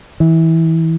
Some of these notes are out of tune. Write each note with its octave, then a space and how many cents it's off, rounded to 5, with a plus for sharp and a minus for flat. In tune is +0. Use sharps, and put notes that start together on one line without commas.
E3 -20